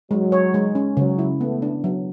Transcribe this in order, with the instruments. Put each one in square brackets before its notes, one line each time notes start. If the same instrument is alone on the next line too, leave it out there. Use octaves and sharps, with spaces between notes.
[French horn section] F#3 [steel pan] G#3
[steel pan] C#5
G#3
C#4
[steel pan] C#3 [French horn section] F#3
[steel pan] E4
[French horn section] A3 [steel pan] B3
[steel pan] D4
F#3